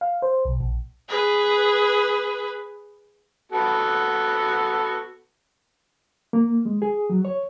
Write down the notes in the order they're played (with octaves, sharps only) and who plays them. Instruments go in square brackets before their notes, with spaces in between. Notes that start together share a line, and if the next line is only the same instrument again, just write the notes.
[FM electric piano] F5
C5
B1
A#1
[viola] G#4 B4
[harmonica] B3 F#4 A4
[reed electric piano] A#3
G#3
G#4
F#3
C#5